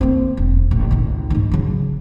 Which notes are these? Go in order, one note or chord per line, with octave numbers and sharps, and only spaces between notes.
A#3 C4
E1
A1
G#1 C#2
G#2 D#3
C#3 F#3